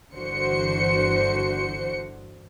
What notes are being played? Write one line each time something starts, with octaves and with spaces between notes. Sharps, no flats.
G1 D3 E3 F#4 C5 C#7